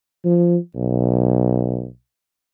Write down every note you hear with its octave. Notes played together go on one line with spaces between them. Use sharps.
F3
B1